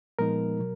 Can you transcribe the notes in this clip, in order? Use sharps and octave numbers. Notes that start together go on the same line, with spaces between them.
A#2 F3 G#3 B3 D#4 A#4
B2 F#3